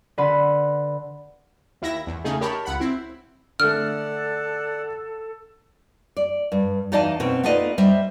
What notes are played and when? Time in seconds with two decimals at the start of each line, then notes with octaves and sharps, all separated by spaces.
0.18 D3 B4 F#5 B5 C6
1.82 D#2 E4 E5 A#6
2.07 E2
2.24 C#3 A3 D#4 G#4
2.41 G4 A#4 C#5 A5 B5
2.65 C#2 F#5 B5
2.80 C4 E4
3.60 D3 A3 A4 D5 F#5 F6
6.17 D5
6.52 G2
6.92 E2 D#4 D5 D#5 F5 A5
7.20 B2 C4 C#4
7.43 B3 D#4 F4 A4 D5 D#5
7.78 G3 C5 D#5 E5